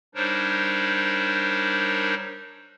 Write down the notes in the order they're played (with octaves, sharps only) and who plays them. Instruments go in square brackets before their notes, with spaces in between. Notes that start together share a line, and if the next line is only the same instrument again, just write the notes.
[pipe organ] G3 D4 D#4 A#4 C5 C#5